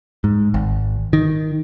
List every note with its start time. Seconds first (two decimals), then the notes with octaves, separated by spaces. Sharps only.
0.24 G#2
0.54 G#1
1.13 D#3